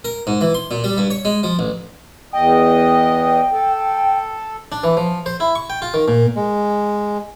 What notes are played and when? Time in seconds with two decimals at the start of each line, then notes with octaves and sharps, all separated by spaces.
0.05 A#4
0.27 G#2
0.41 E3
0.54 C6
0.71 A#2
0.84 G3
0.98 G2
1.10 C#5
1.25 G#3
1.43 F3
1.59 A1
2.33 E2 D#5 G5
3.52 A4
4.72 D4
4.84 E3
4.97 F3
5.26 C5
5.40 E4
5.55 C#6
5.70 G5
5.82 F4
5.94 D#3
6.08 A#2
6.36 G#3